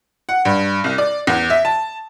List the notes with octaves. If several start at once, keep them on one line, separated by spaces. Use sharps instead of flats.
F#5
G2
C2
D5
E2
E5
A5